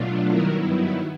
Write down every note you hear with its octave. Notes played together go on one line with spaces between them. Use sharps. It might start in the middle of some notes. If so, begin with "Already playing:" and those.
Already playing: B2 F#3 A3 D4 F4
G2 D#3 F#3 B3 E4 A#4